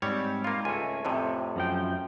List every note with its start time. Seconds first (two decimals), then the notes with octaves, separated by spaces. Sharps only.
0.02 G#2 G3 C4 C#5
0.44 A#3 F4
0.65 C#2 A3 G#5
1.05 F2 A2 C3
1.56 F#2 F3 G5